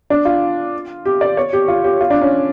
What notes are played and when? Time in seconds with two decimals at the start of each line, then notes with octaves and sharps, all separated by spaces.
0.10 D4
0.25 F4
1.05 G4
1.21 D5
1.37 C#5
1.53 G4
1.68 F4
1.84 G4
2.01 F4
2.10 D4
2.21 C#4